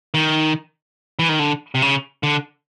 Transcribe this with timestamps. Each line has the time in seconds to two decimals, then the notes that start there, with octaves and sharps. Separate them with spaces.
0.14 D#3
1.19 E3
1.29 D#3
1.39 D3
1.75 C3
1.82 C#3
2.23 D3